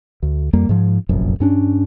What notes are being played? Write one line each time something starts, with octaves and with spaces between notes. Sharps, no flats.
D2
F2 G3 A#3
G#2 F3
F1 A#1 F#2
G2 C#4 D4